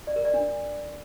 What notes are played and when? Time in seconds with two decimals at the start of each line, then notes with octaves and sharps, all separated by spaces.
0.07 D5
0.16 A#4
0.25 D5
0.34 D4